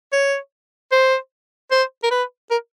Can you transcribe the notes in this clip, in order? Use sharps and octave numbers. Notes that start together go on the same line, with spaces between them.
C#5
C5
C5
A#4
B4
A#4